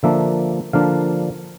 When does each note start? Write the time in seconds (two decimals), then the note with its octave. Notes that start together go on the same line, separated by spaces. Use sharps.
0.03 D3 F3 A#3 D4 E5
0.73 D3 F3 A#3 D4 F5